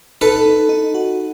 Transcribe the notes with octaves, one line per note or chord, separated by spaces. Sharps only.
D#4 A4 B4
D#4
D#4
F#4